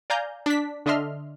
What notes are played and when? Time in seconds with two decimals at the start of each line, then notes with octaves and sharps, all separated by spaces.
0.10 D5 F5 G#5 A#5 G6
0.46 D4 B6
0.86 D3 D4 D#5 E5 C6 F6